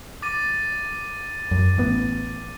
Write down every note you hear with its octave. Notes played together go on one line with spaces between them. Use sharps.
D6 A6 D#7
F#2
A1 B3